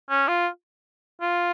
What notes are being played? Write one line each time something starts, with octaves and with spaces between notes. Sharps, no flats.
C#4
F4
F4